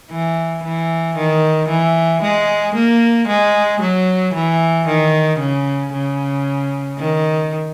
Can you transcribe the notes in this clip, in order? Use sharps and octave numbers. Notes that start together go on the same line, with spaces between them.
E3
E3
D#3
E3
G#3
A#3
G#3
F#3
E3
D#3
C#3
C#3
D#3